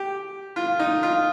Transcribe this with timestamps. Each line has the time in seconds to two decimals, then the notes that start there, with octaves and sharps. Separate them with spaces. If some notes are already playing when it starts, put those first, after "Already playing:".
Already playing: G4
0.56 F4
0.79 D#4
1.03 F4